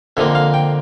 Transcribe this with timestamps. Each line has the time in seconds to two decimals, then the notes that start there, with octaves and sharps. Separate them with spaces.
0.17 F2 D3 F3 A#3 E5
0.35 F5
0.54 G5